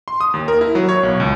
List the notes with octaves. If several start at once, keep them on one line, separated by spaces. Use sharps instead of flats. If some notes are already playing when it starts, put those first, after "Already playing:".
C6
D#6
D#2
A#4
E4
F#3
C#5
B1
C#2